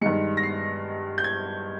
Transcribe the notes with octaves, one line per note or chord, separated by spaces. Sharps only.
G2 D#3 G#3 C#7
A#6
C7
G6
G#6